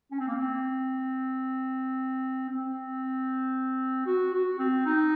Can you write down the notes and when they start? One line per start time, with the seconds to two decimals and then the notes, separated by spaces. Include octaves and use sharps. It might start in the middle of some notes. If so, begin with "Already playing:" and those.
0.11 C#4
0.19 C4
0.28 A#3
0.35 C4
2.49 C4
4.06 F#4
4.33 F#4
4.58 C4
4.86 D#4